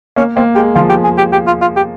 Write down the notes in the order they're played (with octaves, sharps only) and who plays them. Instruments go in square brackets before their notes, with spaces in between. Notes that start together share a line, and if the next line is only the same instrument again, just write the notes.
[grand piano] A#3 [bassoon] C#4
[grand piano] A#3 [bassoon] C4
[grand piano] G#3 [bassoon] G4
[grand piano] F3 [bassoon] F4
[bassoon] G4
G#4
G4
G4
F4
F4
G4